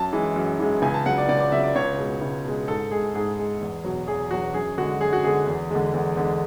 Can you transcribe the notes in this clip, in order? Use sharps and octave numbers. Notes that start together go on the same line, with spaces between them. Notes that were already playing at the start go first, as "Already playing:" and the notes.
Already playing: F#2 A5
E3 G#3
F#2
E3 G#3
C#2 G#5
A5
C#3 F#3 F#5
D5
C#2 D5
D5
C#3 F#3 E5
D5
C#2 C#5
B2 G#3
C#2
B2 G#3
G#2 A4
G#3 G#4
G#2 G#4
G#3
E2
B2 F#3
E2 G#4
B2 F#3 F#4
F#2 G#4
D3 G#3 F#4
F#2 G#4
F#4
D3 G#3 G#4
E2
D3 G#3
E2
D3 G#3